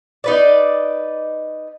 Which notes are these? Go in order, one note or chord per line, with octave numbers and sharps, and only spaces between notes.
D#4 B4 D5